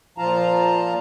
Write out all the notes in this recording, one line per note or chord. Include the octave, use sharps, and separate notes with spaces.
A#2 F3 F4 F5 A5 A#5